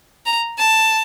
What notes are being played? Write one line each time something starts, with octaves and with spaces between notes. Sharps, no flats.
A#5
A5